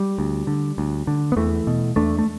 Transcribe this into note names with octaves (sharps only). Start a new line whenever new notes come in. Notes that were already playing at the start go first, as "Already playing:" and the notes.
Already playing: G3
D2
D3
D2
D3
B3
E2 E3 A3
B2
E2 A3 D4
A3